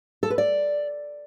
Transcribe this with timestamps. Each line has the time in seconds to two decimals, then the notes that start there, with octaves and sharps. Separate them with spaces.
0.23 A4
0.30 B4
0.38 D5